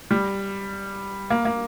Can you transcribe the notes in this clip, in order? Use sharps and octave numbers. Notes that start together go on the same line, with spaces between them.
G3
A#3
A#3